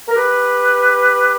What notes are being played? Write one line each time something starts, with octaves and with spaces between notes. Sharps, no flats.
A#4
G4 B4